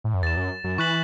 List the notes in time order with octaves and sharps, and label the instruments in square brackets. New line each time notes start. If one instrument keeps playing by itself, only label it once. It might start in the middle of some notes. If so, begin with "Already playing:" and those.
[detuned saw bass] A2
F#2
[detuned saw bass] E2 [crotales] A6 E7
[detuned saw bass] F#2
F#2
[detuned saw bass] E3 [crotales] C#6 F#6 B6 F#7